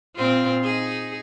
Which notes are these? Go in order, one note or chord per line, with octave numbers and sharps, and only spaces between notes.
A#2 C4 F4
D#4 G#4